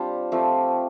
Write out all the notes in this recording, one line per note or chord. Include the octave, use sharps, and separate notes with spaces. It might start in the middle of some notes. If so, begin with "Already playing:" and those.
Already playing: G3 C4 D4 F4 G4
F3 A3 C4 G4